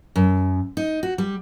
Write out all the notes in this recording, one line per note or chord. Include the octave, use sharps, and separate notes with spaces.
F#2
D#4
F#4
G3